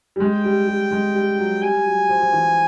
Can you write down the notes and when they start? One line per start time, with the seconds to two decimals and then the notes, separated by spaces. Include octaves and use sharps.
0.16 G3
0.20 G#3 G5
0.44 G3
0.68 G3
0.91 G#3
1.15 G3
1.39 F#3
1.62 G3 G#5
1.86 F#3
2.09 F3
2.22 F3
2.33 E3